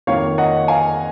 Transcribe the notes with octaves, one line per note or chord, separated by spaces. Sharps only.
F2 D#3 A#3 C#5 F5
D#5 F#5
F5 G#5